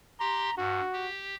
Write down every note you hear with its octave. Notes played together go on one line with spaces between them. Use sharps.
G4 A#5 C6
G2 F#4
G4